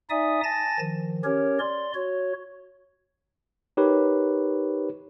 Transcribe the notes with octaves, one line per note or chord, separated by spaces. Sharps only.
D#4 D5 E5 G#5 D#6
G#5 A5 A6 A#6
D#3 F3
C#4 G4 A#4 C#5
D5 C6
F#4 C#5
D#4 G4 A#4 B4 C#5